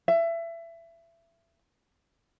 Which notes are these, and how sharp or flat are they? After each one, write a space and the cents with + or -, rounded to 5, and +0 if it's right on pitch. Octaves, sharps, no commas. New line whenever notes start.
E5 +25